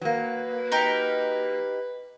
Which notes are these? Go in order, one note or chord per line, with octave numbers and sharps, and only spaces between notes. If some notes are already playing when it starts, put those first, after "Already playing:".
F#3 A#3 B4
D#4 G4 A#4